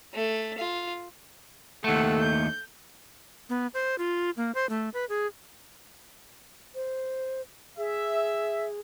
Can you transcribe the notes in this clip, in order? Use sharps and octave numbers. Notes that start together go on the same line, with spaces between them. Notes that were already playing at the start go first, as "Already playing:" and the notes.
A3
F4
D#2 A3 A4 F#5
G6
B3
C5
F4
A#3
C5
A3
B4
G#4
C5
G#4 E5